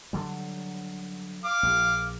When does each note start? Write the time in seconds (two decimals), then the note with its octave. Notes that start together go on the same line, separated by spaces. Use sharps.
0.13 D3 F#3 G3
1.44 F5 D6
1.63 A#1